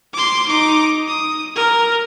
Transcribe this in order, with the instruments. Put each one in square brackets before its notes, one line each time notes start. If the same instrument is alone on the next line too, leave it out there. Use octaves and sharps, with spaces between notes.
[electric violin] C6 D6
D#4 D6
D#6
A#4